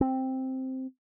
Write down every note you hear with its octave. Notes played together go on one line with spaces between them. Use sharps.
C4